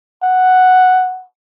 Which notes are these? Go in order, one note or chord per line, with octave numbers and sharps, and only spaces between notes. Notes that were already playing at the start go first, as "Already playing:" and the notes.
F#5